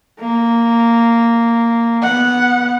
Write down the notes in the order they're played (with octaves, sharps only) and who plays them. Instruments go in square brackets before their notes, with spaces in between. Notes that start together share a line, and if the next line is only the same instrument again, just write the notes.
[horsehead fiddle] A#3
B3 F#5